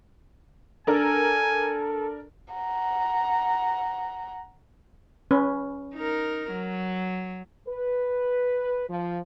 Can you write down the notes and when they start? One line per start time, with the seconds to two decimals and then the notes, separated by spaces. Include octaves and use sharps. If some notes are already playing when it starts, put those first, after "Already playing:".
0.87 D4 A4 A#4 G#5
2.54 F#5 A#5
5.31 C#4 B4
5.95 D#4 A#4
6.52 F#3
7.68 B4
8.89 F3